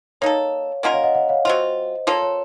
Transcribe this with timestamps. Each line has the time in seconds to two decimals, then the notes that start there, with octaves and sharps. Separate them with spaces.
0.21 A#3 D#4 A4 C#5 F5
0.83 A#3 C#4 F4 A#4 D#5 F#5
0.93 C#5 F5
1.04 D#5 F#5
1.15 D#5 F#5
1.29 C#5 F5
1.45 F#3 C4 F4 C5 D#5
2.07 F3 A#3 F4 A4 C#5
2.22 C#5